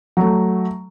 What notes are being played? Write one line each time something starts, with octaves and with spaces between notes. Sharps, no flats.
F#3 A3